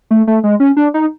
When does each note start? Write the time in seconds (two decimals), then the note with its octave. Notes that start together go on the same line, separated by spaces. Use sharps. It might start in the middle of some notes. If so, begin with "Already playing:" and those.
0.11 A3
0.27 A3
0.44 G#3
0.60 C#4
0.77 D4
0.94 D#4